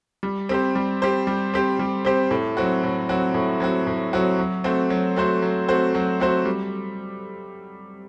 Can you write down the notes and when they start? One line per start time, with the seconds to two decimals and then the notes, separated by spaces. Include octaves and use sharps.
0.23 G3
0.49 C4 G4 C5
0.75 G3
1.02 C4 G4 C5
1.27 G3
1.54 C4 G4 C5
1.79 G3
2.05 C4 G4 C5
2.31 A2
2.57 F#3 C4 F#4
2.83 A2
3.09 F#3 C4 F#4
3.34 A2
3.60 F#3 C4 F#4
3.87 A2
4.13 F#3 C4 F#4
4.39 F#3
4.64 A3 C4 F#4 C5
4.90 F#3
5.16 A3 C4 F#4 C5
5.42 F#3
5.68 A3 C4 F#4 C5
5.95 F#3
6.20 A3 C4 F#4 C5
6.45 G3